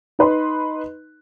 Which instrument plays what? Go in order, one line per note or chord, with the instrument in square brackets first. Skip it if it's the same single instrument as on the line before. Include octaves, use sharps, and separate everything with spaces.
[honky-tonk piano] D#4 B4 C6